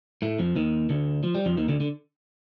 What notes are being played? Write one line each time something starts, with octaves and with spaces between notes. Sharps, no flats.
A2 A3
F2 F3
D#2 D#3
D2 D3
F3
G3
F2 F3
D#2 D#3
D2 D3
D3